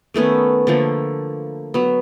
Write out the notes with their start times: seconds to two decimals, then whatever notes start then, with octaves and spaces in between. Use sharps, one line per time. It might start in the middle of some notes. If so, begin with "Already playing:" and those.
0.14 D#3 A3 B3 C#4
0.67 D3 F3 A3 A#3
1.74 F#3 B3